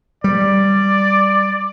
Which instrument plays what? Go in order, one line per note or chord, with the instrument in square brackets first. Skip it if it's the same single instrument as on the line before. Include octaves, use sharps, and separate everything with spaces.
[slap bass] G3 [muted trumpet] D5